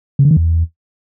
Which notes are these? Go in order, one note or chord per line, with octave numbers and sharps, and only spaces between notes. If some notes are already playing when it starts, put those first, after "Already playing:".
C#3
D3
D#3
E2